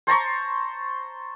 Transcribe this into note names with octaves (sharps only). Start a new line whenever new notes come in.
C5 A5 A#5 C#6